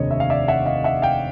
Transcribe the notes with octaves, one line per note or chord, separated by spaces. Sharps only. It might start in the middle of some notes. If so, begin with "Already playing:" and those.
Already playing: F1 D#2 D3 C#5 D#5
E5
F5
D5 E5
E5 F#5
D#5 F5
E5 F#5
F5 G5